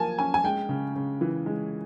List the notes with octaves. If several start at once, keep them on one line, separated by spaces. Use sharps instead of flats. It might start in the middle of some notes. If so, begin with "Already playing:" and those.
Already playing: F3 A#3 G#5 A5
C#4 G#5
G#5
G#3 G5
C#3
C#3
E3
G#3